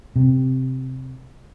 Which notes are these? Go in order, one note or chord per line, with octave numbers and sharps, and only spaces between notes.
C3